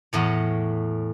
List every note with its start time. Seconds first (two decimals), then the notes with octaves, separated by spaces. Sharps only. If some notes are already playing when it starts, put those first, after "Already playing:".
0.13 E2 A2 C#5